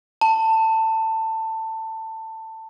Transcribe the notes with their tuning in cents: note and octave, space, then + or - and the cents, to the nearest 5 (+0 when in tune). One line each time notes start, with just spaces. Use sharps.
A5 +20